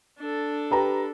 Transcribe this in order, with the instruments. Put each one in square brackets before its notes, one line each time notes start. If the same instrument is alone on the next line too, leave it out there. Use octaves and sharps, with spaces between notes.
[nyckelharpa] D4 A4
[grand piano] G4 B4 A#5